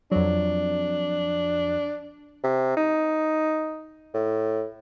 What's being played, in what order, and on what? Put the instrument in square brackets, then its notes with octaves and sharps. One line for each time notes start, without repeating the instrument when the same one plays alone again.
[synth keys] F2 F#3 [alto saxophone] D4
[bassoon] C3
D#4
A2